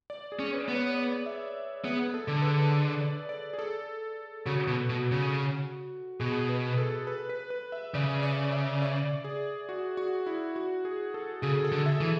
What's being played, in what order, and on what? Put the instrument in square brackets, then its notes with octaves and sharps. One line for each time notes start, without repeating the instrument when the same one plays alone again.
[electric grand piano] D5
G#4
[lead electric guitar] C#4
[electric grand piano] B4
[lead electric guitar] B3
[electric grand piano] C#5
D5
E5
[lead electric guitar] B3 [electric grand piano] G#4
[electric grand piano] A4
[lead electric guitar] D3
[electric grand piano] B4
D5
D5
G#4
A4
[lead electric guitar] C#3 [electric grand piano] F#4
[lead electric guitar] B2
[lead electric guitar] B2 [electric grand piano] F#4
[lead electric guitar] C#3
[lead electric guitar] B2 [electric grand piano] G#4
[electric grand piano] B4
A4
B4
B4
B4
E5
[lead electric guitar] C#3 [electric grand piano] D5
[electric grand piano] D5
E5
D5
G#4
F#4
F#4
E4
F#4
G#4
A4
[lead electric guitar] C#3 [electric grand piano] G#4
[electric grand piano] A4
[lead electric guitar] D3
[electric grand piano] E5
[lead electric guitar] E3